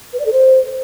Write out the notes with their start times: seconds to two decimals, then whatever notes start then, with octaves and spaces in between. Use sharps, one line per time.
0.13 B4
0.20 D5
0.26 A4
0.33 C5